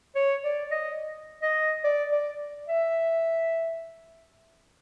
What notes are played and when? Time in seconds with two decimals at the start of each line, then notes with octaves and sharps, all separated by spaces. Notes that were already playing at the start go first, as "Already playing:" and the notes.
0.15 C#5
0.44 D5
0.71 D#5
1.43 D#5
1.84 D5
2.11 D5
2.68 E5